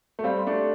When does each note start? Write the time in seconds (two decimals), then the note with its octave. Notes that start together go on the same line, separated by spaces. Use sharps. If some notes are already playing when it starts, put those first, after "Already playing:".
0.19 A3
0.24 G3 C4 F5
0.39 C6
0.47 A3 D4
0.54 G4